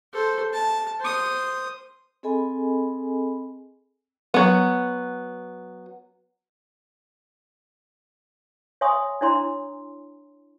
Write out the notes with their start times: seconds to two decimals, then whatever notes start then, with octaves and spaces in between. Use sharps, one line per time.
0.13 A4 C5
0.53 A5
1.00 C5 D#6
2.23 C4 G#4 A4 D#5 G#5 B5
4.34 F#3 B3
8.81 C#5 E5 G#5 C6 C#6 D#6
9.21 D4 E4 C#5 A#5 C6